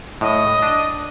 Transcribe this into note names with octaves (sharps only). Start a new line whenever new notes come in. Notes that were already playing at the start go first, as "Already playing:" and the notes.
A2 D#5
D4